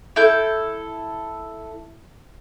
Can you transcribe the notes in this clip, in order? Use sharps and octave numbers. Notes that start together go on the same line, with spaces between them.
E4 A4 G6